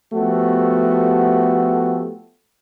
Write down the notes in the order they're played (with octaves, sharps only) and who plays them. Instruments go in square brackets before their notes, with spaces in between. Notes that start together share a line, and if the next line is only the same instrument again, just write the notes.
[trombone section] F3 A3 B3 F#4 G4 A4